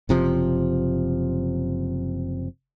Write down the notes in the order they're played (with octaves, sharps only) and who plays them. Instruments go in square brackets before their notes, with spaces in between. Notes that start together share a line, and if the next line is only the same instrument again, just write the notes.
[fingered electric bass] F#1 C3 F3